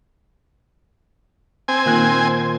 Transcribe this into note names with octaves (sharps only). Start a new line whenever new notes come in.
C4 G#5
A#2 D#3 F#6